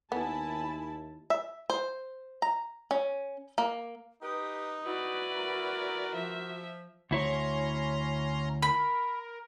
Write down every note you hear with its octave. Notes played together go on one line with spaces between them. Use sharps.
D#2 B3 E4 G#5 A5 B5
E5
C5
A#5
C#4
A#3
D#4 G4 B4 D#6
E4 F#4 B4 D5
A#4
F3 E5
D2 C#4 E4 C#5 A#5 C6
A#4 B5